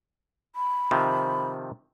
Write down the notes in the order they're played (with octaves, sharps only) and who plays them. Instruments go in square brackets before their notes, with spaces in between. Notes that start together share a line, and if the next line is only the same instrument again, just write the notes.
[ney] B5
[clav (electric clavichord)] C3 D#3 F3